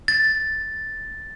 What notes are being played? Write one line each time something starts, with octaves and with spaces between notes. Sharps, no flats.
A6